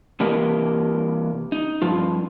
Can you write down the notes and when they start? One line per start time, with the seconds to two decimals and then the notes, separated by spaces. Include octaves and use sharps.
0.20 C3 E3 A#3 G4 A#4 D#5
1.52 D#4
1.82 G2 F3 F4